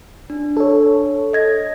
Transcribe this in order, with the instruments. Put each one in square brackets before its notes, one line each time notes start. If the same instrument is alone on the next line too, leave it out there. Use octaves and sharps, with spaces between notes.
[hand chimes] D4
[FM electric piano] A4 C#5
[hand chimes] D#5 G#6 A#6